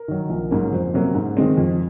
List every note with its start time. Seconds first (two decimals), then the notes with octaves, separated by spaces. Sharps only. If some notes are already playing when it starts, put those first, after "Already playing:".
Already playing: A#4
0.08 D#3 F#3
0.30 A#1
0.51 G#2 F#3 A#3 C#4
0.72 F2 C5
0.94 C3 F#3 A#3 C#4
1.15 G#2
1.37 D#3 G#3 C4
1.57 F2